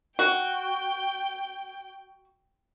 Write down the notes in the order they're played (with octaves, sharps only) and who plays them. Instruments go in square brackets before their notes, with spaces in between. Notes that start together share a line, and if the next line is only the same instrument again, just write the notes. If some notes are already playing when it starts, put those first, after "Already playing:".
[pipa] F#4 [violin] G5